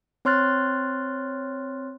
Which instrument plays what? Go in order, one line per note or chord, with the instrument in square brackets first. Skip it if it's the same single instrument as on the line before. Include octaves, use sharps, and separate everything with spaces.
[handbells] C4 C#5 C6 F6 F#6 A6